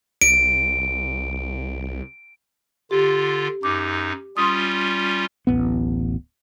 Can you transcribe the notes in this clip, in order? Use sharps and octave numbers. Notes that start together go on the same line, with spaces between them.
C2 D7
D3 F4 G4
F#2 D#4 D6
G3 C#4 F4 C6 D#6
D1 A1 B3